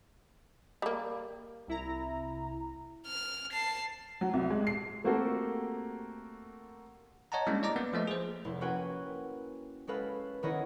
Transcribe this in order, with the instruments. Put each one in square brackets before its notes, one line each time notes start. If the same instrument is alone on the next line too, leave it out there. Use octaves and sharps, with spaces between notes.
[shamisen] G3 A#3
[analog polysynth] C2 E4 A#5
[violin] F6
A5 C7
[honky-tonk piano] F#3
C2
G#3
C7
[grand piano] A3 A#3 C4 F#4 G4 A4
[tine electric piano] C#5 D#5 F#5 A5 A#5
G3 G#3 A#3 C#4 D4 E4
D5 D#5 A#5 D6
A#3 B3 B4
F3 A3 D#5
G#4 C5
[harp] F1 E4 C6
A#3 C#4 F#4 B4 G5 G#5
G#3 C#4 A4 B4 F5
D#3 B3 C#4 E4 C#5 D#5